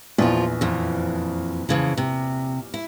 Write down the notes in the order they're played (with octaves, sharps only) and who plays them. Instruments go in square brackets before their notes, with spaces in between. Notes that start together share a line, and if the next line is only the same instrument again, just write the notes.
[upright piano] A#1 E2 [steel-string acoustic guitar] F3 F4
[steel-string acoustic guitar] F2 E3
F2 C#3 E3
C3
E4